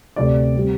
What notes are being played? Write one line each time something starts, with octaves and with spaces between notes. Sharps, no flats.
D2 C3 A3 C4 D5
G3 C4